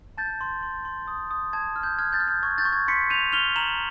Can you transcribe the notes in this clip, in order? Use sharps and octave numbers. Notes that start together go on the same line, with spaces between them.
A5 G6 A6
C6
C6
C6
D#6
D#6
A5 G#6
F6
G6
F6 G#6
G6 A6
F6
G6
C#6 G#6
G6 A6
C#6
G#6
C6 B6 C#7
G6 D#7 F7
F6 F7 G7
A#5 E7 F#7